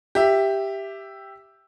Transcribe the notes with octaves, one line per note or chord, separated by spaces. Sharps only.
G4 E5